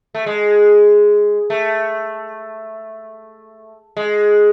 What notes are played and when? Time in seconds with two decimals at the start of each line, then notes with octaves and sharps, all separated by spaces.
0.14 A3
0.26 G#3
1.50 A3
3.97 G#3